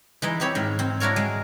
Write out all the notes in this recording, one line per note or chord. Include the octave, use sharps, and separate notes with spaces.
E3 G#3 D#4 E4
C4 E4 G4 C#5 B5
G#2 D#3
C4
D4 E4 F#4 A#4 C#5
G#3 G#4